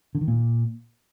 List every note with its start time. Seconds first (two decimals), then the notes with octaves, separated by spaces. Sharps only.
0.15 D3
0.21 D#3
0.28 A#2